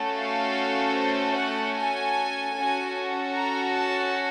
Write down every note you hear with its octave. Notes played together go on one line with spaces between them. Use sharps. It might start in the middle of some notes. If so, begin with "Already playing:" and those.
Already playing: A3 C#4 F#4 A4
F5
C5
F#5
G#5
C#4 F#4 A4 G#5
A#5
A5